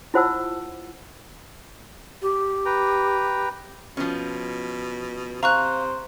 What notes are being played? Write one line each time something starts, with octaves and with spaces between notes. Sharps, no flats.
E4 F4 C5 F#5 A5 E6
G4
B4 G5 A#5
B2 F3 C#4
C3 C5 F5 A#5 C#6 F#6